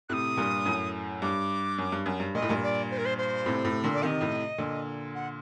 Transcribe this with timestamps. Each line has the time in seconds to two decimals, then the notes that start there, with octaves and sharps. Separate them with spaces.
0.09 A2 C3 D#6 F#6
0.37 G2 A#2
0.66 F#2 A2
1.22 G2 D6
1.78 F#2
1.92 G2
2.06 F#2
2.20 G2
2.35 A#2 D#5
2.42 A2
2.49 G2 A#2
2.63 D5
2.91 C5
2.98 A#4
3.06 C5
3.18 C5
3.46 A2 C3
3.65 A2 C3
3.84 A#2 D3
3.94 D5
4.02 C3 D#3 D#5 F#5
4.21 A2 C3
4.58 A#2 D3
5.15 F#5